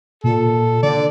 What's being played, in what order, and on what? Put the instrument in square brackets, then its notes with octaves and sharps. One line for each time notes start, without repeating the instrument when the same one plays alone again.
[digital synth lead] A#2 [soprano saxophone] A4
[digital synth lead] D3 [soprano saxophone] D5